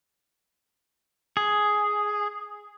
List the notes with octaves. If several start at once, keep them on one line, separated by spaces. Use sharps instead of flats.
G#4